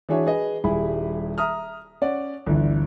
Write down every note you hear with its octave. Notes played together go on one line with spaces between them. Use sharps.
E3 D4 F#4 G#4 C#5 E5
G#4 B4 D#5
D#1 G3 E4 G#4 B5
E5 A#5 D#6 F6
C#4 D5 F#5
G1 D2 E3